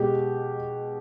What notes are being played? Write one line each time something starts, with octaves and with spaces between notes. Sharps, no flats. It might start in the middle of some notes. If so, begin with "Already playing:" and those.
Already playing: B2 G#3 G4